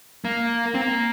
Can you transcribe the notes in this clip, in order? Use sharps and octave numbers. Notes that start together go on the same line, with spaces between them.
A#3
C4
A#3